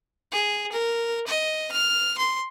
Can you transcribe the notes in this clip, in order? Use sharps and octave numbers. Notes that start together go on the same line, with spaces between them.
G#4
A#4
D#5
F6
C6